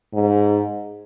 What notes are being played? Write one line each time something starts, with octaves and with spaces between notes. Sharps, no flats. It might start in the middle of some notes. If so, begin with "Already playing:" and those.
G#2